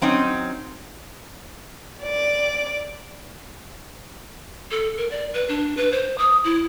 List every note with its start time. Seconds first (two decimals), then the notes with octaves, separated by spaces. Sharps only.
0.01 F#3 C4 C#4 D#4
2.02 D5
4.71 A4
4.97 A#4
5.11 D5
5.34 B4
5.49 D4
5.77 B4
5.92 C5
6.18 D#6
6.44 E4